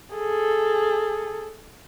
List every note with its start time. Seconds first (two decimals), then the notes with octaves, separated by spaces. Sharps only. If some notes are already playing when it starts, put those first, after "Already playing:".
0.15 G#4 A4